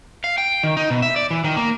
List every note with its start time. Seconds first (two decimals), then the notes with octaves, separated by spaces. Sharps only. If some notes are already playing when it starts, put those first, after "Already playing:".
0.24 F5
0.38 G5
0.63 D#3
0.77 D#4
0.90 B2
1.02 E5
1.16 D5
1.31 E3
1.44 D#3
1.56 A#3